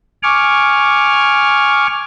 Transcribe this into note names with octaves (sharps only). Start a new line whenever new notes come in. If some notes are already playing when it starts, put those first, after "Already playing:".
G#5 C#6 D6 F6